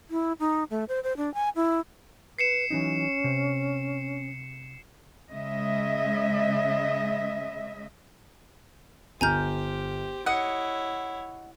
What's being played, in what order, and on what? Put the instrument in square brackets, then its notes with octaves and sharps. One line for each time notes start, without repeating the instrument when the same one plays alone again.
[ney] E4
D#4
A3
C5
C5
D4
G#5
E4
[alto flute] B4 [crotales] C7 C#7 E7
[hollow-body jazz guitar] E3 F#3 D#4 [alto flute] C#4
[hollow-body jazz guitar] C3
[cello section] C#3 G#3 D#5 E5
[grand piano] G1 F6 [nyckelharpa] G4 C5 [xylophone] G#5 A#5 G6
[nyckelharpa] E4 C#5 [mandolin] D#5 F#5 [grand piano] C#7